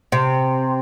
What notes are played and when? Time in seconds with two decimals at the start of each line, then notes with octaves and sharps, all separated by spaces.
0.12 C3